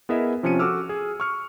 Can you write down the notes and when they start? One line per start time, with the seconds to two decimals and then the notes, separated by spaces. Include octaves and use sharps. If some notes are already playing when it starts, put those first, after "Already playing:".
0.09 B3 E4 G#4 A#4 D#5 E5
0.43 C3 F3 C#4 F4 C#7 D#7
0.59 F#4 A4 D6 E6 F6
0.89 G#4
1.20 C#6 F6 C#7